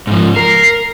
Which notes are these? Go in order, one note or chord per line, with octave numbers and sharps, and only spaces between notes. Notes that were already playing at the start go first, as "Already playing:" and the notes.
G#2 F3
A#4 C7